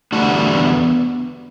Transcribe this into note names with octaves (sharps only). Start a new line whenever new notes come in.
E2 D3 G3 A3 D4 F#4
B3